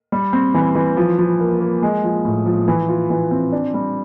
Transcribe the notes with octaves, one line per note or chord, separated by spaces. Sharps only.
G3
C4
E3
E3
F3
F3
A#3
A#3
G#3
F3
A2
F3
E3
F4
E3
C4
D4
G3